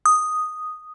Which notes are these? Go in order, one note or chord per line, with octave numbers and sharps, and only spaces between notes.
D#6